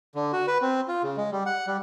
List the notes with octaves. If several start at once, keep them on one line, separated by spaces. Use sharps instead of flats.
D3
F#4
B4
C4
F4
C#3
G#3
G3
F#5
G3